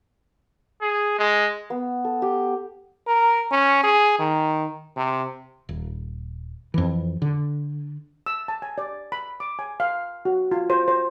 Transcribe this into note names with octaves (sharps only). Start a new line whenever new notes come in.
G#4
G#3
B3
A4
G4
A#4
C#4
G#4
D#3
C3
D#1
F2 E3
D3
E6
A5
G#5
D5
B5
D6
G#5
F5
F#4
F4
C5
C5